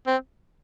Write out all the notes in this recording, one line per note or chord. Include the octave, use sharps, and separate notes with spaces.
C4